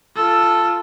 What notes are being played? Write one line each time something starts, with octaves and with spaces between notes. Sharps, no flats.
F4 A4